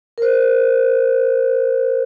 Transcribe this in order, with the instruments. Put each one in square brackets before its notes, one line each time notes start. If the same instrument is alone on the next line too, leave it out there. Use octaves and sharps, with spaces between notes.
[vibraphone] A#4 C5